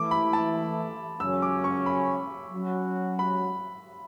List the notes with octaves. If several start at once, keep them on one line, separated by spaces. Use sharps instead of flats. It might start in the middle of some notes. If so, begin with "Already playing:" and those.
Already playing: E3 A3 E4 D6
B5
A5
F#2 C#3 F#3 C#4 E6
D6
C#6
B5
F#3 C#4 F#4
B5